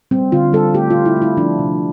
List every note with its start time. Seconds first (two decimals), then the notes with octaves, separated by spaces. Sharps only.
0.11 G3 C4
0.32 D3 F4
0.53 G3 A4
0.74 A3 G4
0.90 F4
0.95 D3
1.06 E4
1.16 A3
1.22 E4
1.37 F3 D4
1.59 C3